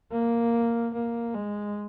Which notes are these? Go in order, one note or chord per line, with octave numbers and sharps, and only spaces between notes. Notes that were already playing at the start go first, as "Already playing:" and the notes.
A#3
A#3
G#3